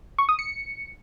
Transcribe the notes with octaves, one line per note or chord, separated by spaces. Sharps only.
C#6
D#6
C#7